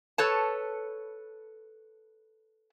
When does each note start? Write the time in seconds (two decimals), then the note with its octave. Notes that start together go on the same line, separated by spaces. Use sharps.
0.18 A4 B4 C#5 A5